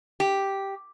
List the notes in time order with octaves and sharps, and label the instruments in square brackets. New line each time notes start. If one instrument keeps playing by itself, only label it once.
[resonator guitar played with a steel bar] G4